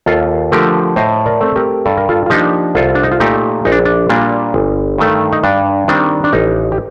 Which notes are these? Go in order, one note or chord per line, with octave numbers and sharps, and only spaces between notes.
D#2 F4 A4
D3 F3 A3 G4 A#4
A2 C5 D#5
A#4 D5
A3 C4
G4 A#4
G2 A4
A#4
F4 A4
F4
F3 A#3 D4 D#4 G4
C2 F4 A4
D4
D#4
F4
A#2 A3 D#4 G4
A#1 D#4
D4
D4
A#2 G3 A#3 D4
G1
G2 D#3 A3
D#4
G2 D4
D#3 G3 C4 D4
D4
A1 D#4
G4